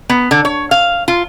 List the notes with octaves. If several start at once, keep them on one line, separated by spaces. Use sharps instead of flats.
B3
D3
C#5
F5
F4